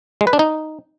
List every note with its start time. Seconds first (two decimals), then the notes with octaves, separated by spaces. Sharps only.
0.21 G#3
0.27 B4
0.33 D4
0.39 D#4